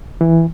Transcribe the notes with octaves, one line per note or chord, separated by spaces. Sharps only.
E3